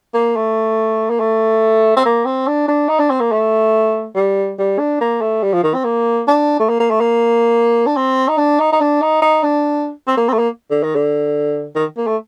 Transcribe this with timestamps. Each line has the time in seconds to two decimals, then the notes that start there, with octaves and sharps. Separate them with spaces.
0.14 A#3
0.36 A3
1.10 A#3
1.20 A3
1.96 C4
2.05 A#3
2.25 C4
2.47 D4
2.68 D4
2.89 D#4
3.00 D4
3.10 C4
3.20 A#3
3.32 A3
4.15 G3
4.59 G3
4.79 D4
5.01 A#3
5.21 A3
5.43 G3
5.53 F3
5.63 D#3
5.74 C4
5.84 A#3
6.27 D4
6.60 A3
6.69 A#3
6.80 A#3
6.90 A3
7.00 A#3
7.86 D4
7.96 C4
8.28 D#4
8.38 D4
8.60 D#4
8.72 D#4
8.81 D4
9.02 D#4
9.22 D#4
9.43 D4
10.08 C4
10.17 A#3
10.28 C4
10.33 A3
10.39 A#3
10.71 D3
10.83 D#3
10.95 D3
11.75 D#3
11.98 A#3
12.07 A3